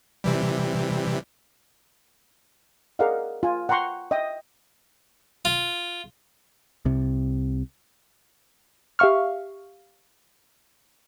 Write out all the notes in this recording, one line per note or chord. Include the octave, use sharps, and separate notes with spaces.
C3 E3 G3
G#4 A#4 D5 D#5 F5 F#5
F4 G#5
F#5 G5 A#5 C6 C#6
D#5 E5 G5 D#6
F4
C2 C3
G4 E5 F5 C#6 F6